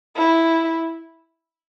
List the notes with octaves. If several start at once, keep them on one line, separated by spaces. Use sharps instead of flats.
E4